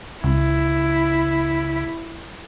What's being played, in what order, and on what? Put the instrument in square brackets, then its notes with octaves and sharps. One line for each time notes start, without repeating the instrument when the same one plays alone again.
[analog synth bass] C#2 [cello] E4